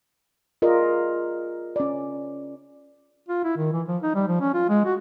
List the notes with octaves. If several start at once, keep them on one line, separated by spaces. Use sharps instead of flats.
F4 G#4 A#4 D5 D#5
C#4 D5
F4
E4
D#3
E3
F3
D#4
G3
F3
C#4
F4
G#3
F#4